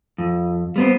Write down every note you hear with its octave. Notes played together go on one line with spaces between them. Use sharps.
F2
G3 B3 C4